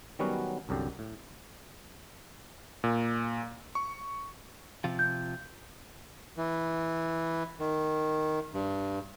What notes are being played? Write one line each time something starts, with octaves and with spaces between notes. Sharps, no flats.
D#3 F#3 G3 B3 C#4 F#4
C2 F#2 D3 G4
A2
A#2
C#6
C3 F3 F4
G6
E3
D#3
G2